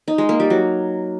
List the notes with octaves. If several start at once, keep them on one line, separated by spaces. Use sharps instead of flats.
D#4
G#3
A#3
G3
F#3